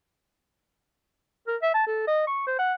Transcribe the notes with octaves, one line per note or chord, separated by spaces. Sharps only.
A#4
E5
A5
A4
D#5
C#6
C5
F#5